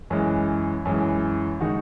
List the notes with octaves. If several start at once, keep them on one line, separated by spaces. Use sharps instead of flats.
F#2 E3 G#3
F#2 E3 G#3
D#3 G#3 D#4 F#4